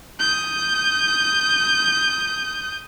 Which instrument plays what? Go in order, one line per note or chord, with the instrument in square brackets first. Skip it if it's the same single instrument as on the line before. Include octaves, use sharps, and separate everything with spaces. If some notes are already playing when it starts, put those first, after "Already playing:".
[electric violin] D#6 G6